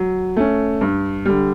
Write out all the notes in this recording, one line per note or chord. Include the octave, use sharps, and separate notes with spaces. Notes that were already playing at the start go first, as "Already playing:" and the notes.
Already playing: F#3
A3 C#4
G2
D3 G3